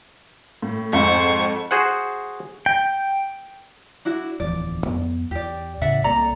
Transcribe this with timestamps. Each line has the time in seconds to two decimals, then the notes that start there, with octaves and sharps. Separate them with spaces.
0.62 A2
0.93 F2 G#2 C5 F#5 C#6
1.71 F#4 G#4 C5 F#5
2.66 G5
4.05 D4 E4 F#4
4.40 D1 E2 F3 D5
4.87 F2 B3
5.31 E2 G4 D5
5.81 E2 A2 C#3 D5 E5 F#5
6.04 C2 A#3 A4 D5 A#5